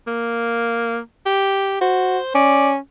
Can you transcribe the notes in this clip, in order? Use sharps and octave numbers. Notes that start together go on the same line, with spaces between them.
A#3
G4
F#4 C5
C#4 D5